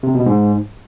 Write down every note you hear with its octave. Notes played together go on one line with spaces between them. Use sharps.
C3
B2
G#2